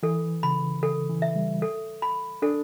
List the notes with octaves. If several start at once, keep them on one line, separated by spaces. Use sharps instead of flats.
E3 A4
C#3 B5
C#3 A4
E3
E5
G3
A4
B5
D4 A4